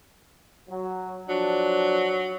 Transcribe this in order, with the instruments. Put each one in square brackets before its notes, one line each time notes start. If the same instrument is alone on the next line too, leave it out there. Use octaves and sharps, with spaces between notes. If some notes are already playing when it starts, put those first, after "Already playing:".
[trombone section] F#3
[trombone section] F3 D4 [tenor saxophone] F#3